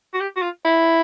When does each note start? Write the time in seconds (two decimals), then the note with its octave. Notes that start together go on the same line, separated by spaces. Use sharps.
0.14 F#4
0.20 G4
0.36 F#4
0.42 F4
0.65 E4